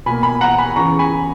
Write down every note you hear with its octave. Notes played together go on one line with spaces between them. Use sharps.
B2 A#3 G#5 B5
G#5 B5
F#5 A#5
G#5 B5
E2 C#3 E3 A#5 C#6
G#5 B5